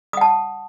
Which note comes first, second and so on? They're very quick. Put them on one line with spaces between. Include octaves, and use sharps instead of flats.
D#6 F#5 A5